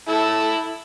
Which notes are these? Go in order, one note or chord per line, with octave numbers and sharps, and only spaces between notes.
E4 A4